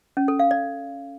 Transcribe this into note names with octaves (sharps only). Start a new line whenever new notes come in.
C#4
A4
F5
D5